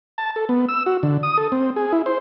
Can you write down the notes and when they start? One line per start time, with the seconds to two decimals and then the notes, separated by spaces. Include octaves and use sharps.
0.18 A5
0.36 A4
0.49 B3
0.69 E6
0.86 F#4
1.03 D3
1.23 D#6
1.38 A4
1.52 C4
1.76 G#4
1.93 E4
2.06 C5